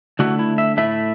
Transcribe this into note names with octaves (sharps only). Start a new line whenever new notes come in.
D3 A3 E4 F#4
E4
E5
A2 A3 E4 E5